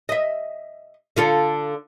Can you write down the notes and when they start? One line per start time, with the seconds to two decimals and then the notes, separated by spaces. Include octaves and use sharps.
0.09 D#5 E5
1.16 D3 F4 A4